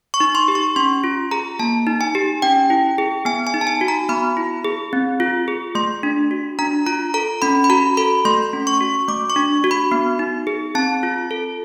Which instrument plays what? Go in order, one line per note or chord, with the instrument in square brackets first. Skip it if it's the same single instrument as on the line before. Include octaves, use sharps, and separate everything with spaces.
[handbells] C#6
D#4
C6
G4
C#6
C#4 C6
F4
G#4 A#5
A#3 A5
D#4
G#5
G4
C#4 G5
E4
G#4
B3 G#5
G#5
D#4
A5
G#5
F#4
A#5
B3 B5
E4
G#4
C4
F4
G#4
A3 C6
D4
F#4
D4 A#5
F4 A#5
A4 A#5
C#4 B5
B5
F#4 A#5
A4 B5
A3 C6
C#4
C#6
F#4
A3 D6
C#6
D4
F#4
B5
B3
D#4
G#4
C4 A5
F4
A4